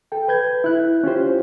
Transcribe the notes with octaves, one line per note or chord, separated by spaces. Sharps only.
A4 G5
B4 G6 G#6
E4 F#6
C#4 F4 G4 C5